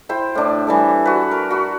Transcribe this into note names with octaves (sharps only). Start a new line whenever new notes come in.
E4 C5 G5
A2 D4
E3 G3 A4
F#4 B4
A#4
F#4 B5